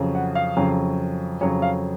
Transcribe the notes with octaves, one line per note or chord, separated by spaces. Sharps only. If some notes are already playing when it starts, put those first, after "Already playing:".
Already playing: F2 C#3 F#3
F#5
F5
F2 C#3 F#3
F2 C#3 F#3 C#5
F5